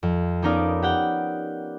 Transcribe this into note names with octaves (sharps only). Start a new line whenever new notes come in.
F2
B3 C#4 D#4 A#4 D5 F5
G4 F#5 G5